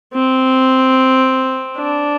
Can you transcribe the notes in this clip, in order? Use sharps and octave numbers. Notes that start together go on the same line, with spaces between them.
C4
D4